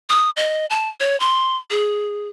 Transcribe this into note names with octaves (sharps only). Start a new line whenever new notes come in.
D#6
D#5
A5
C#5
C6
G#4